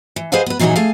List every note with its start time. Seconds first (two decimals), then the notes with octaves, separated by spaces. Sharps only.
0.16 E3
0.32 G#4 B4 C5 D#5 F5 F#5
0.46 B3 B4
0.59 A#2 E3 F#3 D#4 F#4 G#4
0.76 A3 G#4 F5